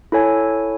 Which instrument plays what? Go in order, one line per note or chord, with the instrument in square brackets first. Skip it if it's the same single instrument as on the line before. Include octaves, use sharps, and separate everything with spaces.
[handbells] E4 A4 C#5 G#5